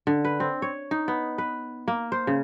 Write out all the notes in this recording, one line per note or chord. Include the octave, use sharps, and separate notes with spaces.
D3
B4
C4
C#5
D#4
B3
B4
A#3
C5
C#3